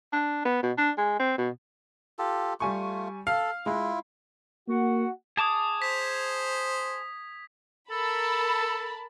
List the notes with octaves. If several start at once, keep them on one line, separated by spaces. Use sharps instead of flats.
D4
B3
B2
D4
G#3
C4
B2
F4 G4 A4
G3 A3 F4 G#5 C#6
A4 F5
G#3 E4 F4
A#3 F#4 F#5
G#4 A5 D6 D#6 G#6
C5 B6
A4 A#4 A5 B5